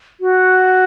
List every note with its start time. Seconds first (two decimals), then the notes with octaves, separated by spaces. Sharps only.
0.20 F#4